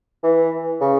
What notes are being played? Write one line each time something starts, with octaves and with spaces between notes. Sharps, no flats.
E3
C#3